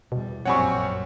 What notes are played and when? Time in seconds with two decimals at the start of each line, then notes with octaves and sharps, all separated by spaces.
0.12 E2 B2 G3
0.45 A#1 F#2 G3 C4 C#5 F#5 G#5 C#6